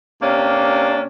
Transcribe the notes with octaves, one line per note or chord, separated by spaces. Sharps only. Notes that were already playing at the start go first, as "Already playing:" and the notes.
C3 A#3 C#4 D4